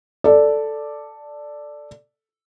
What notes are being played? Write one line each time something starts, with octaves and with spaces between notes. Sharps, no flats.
A4 D5